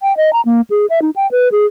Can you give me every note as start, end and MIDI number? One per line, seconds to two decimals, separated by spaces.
0.02 0.15 79
0.17 0.33 75
0.33 0.41 82
0.45 0.61 58
0.70 0.86 68
0.90 1.00 76
1.02 1.10 63
1.16 1.30 79
1.31 1.48 71
1.52 1.66 68